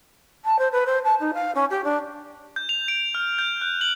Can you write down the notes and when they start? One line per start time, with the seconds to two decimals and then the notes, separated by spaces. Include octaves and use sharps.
0.45 A5
0.59 C5
0.72 B4
0.86 C5
1.04 A5
1.20 D#4
1.34 F5
1.55 C#4
1.70 G4
1.84 D4
2.56 G6
2.69 F7
2.88 D7
3.15 F6
3.38 G6
3.61 F#6
3.81 F#7